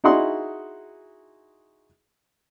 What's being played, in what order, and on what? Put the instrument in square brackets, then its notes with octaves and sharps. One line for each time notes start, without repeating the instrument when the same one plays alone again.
[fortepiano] D#4 E4 F#4 G#4 F#5 C6